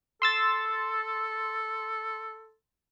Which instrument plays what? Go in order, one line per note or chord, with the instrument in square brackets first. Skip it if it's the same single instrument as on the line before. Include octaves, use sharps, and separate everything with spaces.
[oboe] A4 [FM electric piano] C6 E6 A6